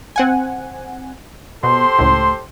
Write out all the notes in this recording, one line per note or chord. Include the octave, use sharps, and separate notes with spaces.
C4 F#5 G#5
B2 G4 A4 C5 C6
C#2 A2